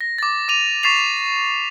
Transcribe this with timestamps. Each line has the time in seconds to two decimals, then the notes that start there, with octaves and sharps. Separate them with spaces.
0.01 A#6
0.18 D6 A6
0.48 D6 D#7 F7
0.83 C#6 A6 B6 C7 E7 F7